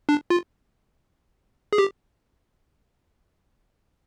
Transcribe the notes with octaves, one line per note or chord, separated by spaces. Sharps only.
D4
F4
G#4
G4